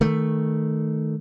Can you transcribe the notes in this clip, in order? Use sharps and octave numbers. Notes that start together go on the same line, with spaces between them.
D#3 A3